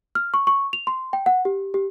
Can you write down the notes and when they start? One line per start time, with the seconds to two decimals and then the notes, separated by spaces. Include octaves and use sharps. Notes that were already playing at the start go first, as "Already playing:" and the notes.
0.15 F6
0.34 C#6
0.47 C#6
0.73 F7
0.87 C6
1.13 G5
1.26 F#5
1.45 G4
1.74 G4